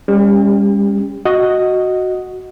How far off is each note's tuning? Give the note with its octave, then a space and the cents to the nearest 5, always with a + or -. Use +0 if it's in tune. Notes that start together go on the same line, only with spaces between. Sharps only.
G3 +45 C#4 +0 G4 +20
F#4 +0 D#5 +0